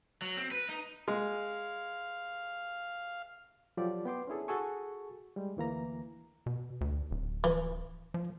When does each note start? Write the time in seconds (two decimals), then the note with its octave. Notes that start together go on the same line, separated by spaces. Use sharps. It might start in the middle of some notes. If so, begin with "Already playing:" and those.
0.22 F#3
0.37 C4
0.52 B4
0.69 D#4
1.08 G#3 F5
3.77 F3 F#3 F4 G4 A4 D5
4.05 B3 G5 C6 D6
4.27 C#4 D4 E4 G#4 A4
4.48 F#4 G#4 A4 G#5 C#6
5.36 G3 G#3
5.57 D2 E3 A#3 A#5
6.46 B2
6.81 D2
7.11 D1
7.44 E3
8.14 F3